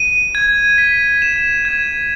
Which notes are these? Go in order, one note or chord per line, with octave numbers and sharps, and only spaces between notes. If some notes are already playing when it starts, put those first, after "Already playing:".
Already playing: D#7
G#6
B6
E7
G#6